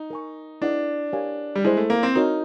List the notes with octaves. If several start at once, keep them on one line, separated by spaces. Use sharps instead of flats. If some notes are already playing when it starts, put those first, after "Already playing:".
Already playing: D#4
A#4 D#5 G#5 C#6
D4 E4 G#4 B4 D#5 F#5
G4 A#4 C#5 F5 G#5
G3
G#3 E4 G#4 C5
A3
A#3
C4
D#4 F#4 A#4 C#5